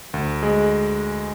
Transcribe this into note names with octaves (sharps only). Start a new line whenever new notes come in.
D2
G#3